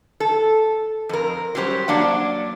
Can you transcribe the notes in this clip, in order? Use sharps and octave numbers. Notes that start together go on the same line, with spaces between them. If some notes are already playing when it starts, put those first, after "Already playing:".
A4
F2 A#4
F#3 G3 C#4 G4 C5
F#3 A#3 D4 F#5